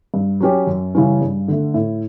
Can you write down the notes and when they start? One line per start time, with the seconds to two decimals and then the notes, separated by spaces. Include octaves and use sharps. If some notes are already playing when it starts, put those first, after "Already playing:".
0.14 G2
0.41 F#3 C#4 G4
0.67 F#2
0.95 C#3 E3 G3 C#4
1.21 G2
1.48 D3 A3
1.74 A2